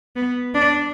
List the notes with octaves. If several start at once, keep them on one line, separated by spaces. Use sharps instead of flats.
B3
D4